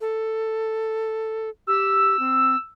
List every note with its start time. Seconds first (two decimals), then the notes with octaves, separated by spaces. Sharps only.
0.01 A4
1.67 G4 E6
2.19 C4